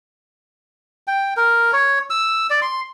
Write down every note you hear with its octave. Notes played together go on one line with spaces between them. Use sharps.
G5
A#4
C#5
E6
D5
C6